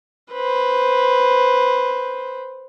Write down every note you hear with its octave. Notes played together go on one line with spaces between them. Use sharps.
B4 C5